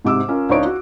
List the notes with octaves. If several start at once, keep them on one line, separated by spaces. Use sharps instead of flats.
G#2 C3 D6 E6
C#4 F4 A#4
C#2 D4 D#4 C#5 D7
F#4